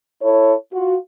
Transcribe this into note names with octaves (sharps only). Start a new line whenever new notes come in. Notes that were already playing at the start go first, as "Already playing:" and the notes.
E4 A4 C#5
F4 F#4